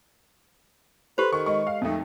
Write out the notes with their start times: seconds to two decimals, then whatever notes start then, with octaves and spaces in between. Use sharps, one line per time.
1.18 G4 A4 B4 C5 C6
1.32 D#3 C#6
1.46 G#3 D#5 C#6
1.67 F5
1.81 F2 A3 D#4